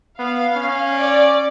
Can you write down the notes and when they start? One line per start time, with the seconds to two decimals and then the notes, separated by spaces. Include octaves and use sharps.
0.19 B3 F5
0.56 C#4
0.95 D5